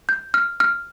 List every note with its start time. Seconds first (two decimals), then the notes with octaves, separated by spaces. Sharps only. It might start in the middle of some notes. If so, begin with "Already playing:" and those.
0.09 G6
0.34 F6
0.60 F6